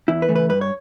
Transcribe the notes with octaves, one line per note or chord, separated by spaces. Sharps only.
E2 E4
B4
C#3 E3 A3
B4
G2 B4
C#5